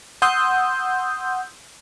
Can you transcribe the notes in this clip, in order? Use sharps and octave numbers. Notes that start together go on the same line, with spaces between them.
F#5 C6 D#6 E6 G6